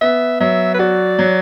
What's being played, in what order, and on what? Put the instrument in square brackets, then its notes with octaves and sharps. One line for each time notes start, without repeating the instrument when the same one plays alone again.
[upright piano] B3 [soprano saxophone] E5
[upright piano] F#3 [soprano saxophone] E5
[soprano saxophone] B4
[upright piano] F#4 [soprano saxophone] D5
[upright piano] F#3